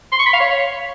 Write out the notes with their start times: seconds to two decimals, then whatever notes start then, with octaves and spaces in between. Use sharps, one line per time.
0.12 C6
0.19 C#6
0.26 B5
0.33 F5
0.40 C#5